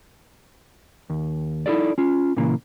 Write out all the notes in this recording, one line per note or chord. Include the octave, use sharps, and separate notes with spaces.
D#2
D#4 E4 G#4 A4 D5
C#4 F4
A#2 C#3 E3 A#3